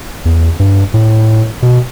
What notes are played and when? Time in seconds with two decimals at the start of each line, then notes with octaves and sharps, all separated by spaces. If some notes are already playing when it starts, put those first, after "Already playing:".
0.25 E2
0.60 G2
0.94 A2
1.62 B2